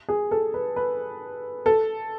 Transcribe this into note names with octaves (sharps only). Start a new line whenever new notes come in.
G#4
A4
B4
B4
A4